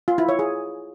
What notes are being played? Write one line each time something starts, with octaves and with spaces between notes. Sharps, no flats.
F4
E4
C#5
G#4